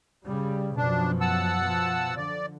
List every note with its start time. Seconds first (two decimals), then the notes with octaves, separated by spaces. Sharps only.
0.25 C#3 G3
0.77 F#2 B2 F3 D4
1.21 F#5 A5 E6
1.59 B2 F3
2.17 D3 D5